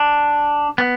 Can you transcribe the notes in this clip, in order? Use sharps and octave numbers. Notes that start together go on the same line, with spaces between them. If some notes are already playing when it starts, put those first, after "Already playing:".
Already playing: D4
B3